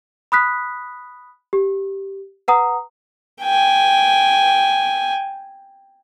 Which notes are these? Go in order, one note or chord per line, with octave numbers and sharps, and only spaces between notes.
B5 D#6 F#6 B6
G4
B4 F#5 A#5 D#6
G5 G#5